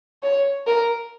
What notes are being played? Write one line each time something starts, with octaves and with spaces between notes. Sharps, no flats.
C#5
A#4